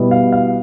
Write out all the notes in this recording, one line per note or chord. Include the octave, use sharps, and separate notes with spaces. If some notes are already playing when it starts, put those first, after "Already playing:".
Already playing: B2 G3 B3 E4
F5
F5